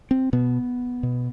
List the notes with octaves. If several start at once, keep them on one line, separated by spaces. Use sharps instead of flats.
C4
B2 B3
B2